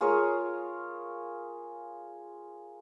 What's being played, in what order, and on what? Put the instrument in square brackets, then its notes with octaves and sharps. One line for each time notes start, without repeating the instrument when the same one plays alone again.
[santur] F4 G#4 A#4 C#5